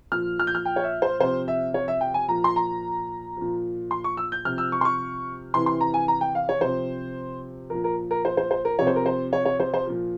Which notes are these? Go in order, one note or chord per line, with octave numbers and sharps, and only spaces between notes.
A#2 F3 F6
F6
G6
F6
G5
C#5
E5
C5
C3 F3 C5
E5
C#5
E5
G5
G#5
A#2 F3 A#5
C6
A#5
A#2 F3
C6
C#6
E6
G6
C3 F3 F6
E6
C#6
C6
C#6
C3 E3 C6
C6
A#5
G#5
A#5
G5
F5
C#5
C3 F3 C5
A#2 F3 A#4
A#4
A#4
C5
C5
C5
A#4
C3 F3 C#5
C5
A#4
C5
C#5
C#5
C5
C5
A#2 F3